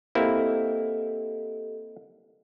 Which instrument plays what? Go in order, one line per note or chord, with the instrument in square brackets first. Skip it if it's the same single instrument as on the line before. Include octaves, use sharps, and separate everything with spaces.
[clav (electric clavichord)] A#3 C4 E4 [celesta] G4 A4 D#5